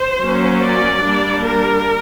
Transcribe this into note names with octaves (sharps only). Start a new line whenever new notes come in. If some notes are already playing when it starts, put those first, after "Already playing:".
Already playing: C5
F#3 A#3 C#4
D5
G3 A#3 D4
A#4